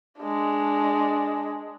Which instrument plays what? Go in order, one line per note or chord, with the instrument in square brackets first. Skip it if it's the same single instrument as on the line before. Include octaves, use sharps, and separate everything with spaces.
[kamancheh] G#3 D4